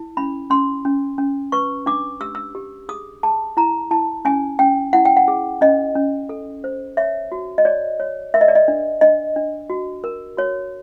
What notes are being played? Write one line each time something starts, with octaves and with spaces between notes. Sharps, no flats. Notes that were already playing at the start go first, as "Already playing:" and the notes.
Already playing: E4
C#4 B5
C#4 C6
C#4
C#4
B4 C#6
D4 D6
G4 E6
E6
G4
G#4 D#6
G#4 A5
E4 A#5
E4 A5
C#4 G#5
C#4 G5
E4 F#5
G5
F#5
G#4
C#4 D#5
C#4
A4
C5
C#5 E5
F#4
D#5
C#5 D5
C#5
A#4 E5
D#5
D5
D#5
D4
D4 D#5
D4
F#4
A#4
F#4 C#5